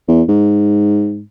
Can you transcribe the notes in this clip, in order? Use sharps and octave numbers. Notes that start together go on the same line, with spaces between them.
E2
G#2